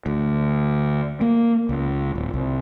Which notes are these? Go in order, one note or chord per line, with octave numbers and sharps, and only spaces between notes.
D2
A#3
C#2
D1
C2